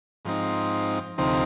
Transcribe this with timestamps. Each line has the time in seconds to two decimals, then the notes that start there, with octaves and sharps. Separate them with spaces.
0.25 G#2 F3 C4 D#4
1.18 D2 C3 F3 C4 D#4